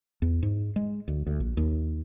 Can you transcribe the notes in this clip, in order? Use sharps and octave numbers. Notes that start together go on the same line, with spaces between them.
E2
G#2
G#3
D2
D2
A#1
D#2